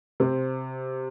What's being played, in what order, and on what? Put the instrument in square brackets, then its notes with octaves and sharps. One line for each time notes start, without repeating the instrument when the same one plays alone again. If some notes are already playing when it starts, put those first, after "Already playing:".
[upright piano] C3 C4